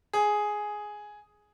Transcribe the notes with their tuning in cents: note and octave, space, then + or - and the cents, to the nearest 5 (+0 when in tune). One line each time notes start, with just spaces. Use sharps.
G#4 +5